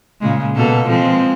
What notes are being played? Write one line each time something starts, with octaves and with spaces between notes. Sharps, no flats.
A#2 C#3 G#3
B2 A#3 A4
F3 G#3 C4